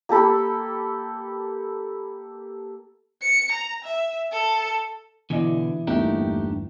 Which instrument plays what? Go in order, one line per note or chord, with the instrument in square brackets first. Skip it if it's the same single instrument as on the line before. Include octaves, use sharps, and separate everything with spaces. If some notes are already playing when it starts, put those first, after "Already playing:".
[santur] A#3 G4 A4 B5
[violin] C#7
A#5
E5
A4
[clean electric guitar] B2 D3 [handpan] E3 [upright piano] D5 D#5 G#5
[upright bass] G1 E2 [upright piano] A3 A#3 D#4 [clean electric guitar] D4 G4 A#4